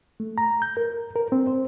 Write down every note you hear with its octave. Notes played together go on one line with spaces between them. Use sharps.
A3
A#5
G6
A#4
A#4
C4
C5